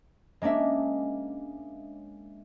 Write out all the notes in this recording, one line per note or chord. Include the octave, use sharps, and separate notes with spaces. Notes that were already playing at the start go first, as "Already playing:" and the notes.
G#3 A#3 C#4 D4 E5